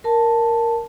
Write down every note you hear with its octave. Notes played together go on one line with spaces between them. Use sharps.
A#4 A5